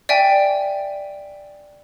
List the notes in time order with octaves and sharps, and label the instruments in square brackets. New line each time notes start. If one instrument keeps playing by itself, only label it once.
[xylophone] D5 E5 G5 G#5